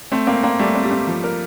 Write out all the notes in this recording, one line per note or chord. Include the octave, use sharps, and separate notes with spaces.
A3 C4
A#3 C4
A#3 C4
G3 A3
C4
G3
C4
F3
A#4